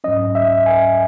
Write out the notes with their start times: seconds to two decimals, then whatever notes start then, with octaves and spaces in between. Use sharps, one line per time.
0.04 G#2 F#3 C#4 D#5
0.35 E5
0.66 G#5